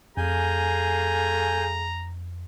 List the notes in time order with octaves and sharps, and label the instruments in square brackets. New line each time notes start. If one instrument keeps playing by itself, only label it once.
[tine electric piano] F2 [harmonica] A3 G#4 F5 [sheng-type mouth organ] G#5 G6 [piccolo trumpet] A#5